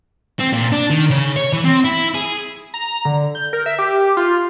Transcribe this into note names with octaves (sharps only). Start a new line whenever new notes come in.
C4
A#2
D4
D#3
C#3
C#5
E3
C4
E4
G#4
A#5
D3
G6
A#4
E5
G4
F4